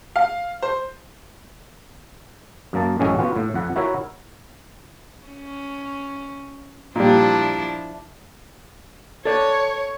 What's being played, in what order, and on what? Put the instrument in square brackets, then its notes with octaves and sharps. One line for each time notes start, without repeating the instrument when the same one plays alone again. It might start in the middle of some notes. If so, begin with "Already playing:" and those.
[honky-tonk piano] F5
C5
[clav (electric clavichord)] F#2 A#3 A5
A1 F#2 A2 G#3 C#4
B3 F4 F#4
A2
F2 F#5
E4 F#4 A#4 C#5 E5
[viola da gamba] C#4
[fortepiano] A#2 G3 [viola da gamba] F3 D4 E4
[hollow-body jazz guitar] A4 D5 [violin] C#5